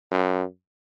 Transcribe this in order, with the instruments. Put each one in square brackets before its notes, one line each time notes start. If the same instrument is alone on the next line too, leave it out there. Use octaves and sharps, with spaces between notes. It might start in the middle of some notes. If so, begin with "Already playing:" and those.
[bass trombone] F#2